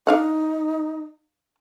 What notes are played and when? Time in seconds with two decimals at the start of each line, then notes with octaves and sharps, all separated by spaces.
0.07 D4 D#4 F5 F#5